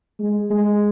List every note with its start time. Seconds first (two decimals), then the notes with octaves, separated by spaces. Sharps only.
0.19 G#3
0.50 G#3